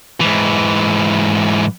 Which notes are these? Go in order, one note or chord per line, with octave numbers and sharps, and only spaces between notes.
G#2 E3